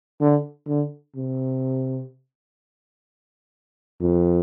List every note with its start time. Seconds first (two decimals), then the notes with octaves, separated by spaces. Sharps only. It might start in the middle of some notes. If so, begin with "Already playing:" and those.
0.21 D3
0.67 D3
1.16 C3
4.01 F2